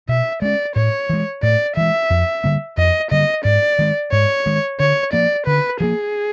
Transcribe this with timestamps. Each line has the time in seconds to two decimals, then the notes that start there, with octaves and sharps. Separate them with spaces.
0.09 B2 E5
0.42 G#3 C#4 D5
0.76 A2 C#5
1.09 E3 G#3
1.43 A2 D5
1.76 E3 G#3 E5
2.10 F2
2.44 D3 G3 A#3
2.77 F2 D#5
3.11 D3 G3 A#3 D#5
3.45 G#2 D5
3.79 D#3 G#3
4.12 G#2 C#5
4.46 D#3 G#3
4.80 D3 C#5
5.13 F3 A#3 D5
5.46 D3 B4
5.80 F3 A#3 G#4